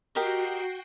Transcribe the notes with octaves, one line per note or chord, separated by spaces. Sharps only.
F#4 G4 A#4 D#5 G5 C7